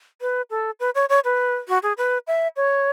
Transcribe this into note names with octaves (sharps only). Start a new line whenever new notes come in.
B4
A4
B4
C#5
C#5
B4
F#4
G#4
B4
E5
C#5